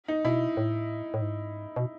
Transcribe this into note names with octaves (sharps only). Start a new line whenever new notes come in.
D#4
B2 E4
A2
A2
G#2
B2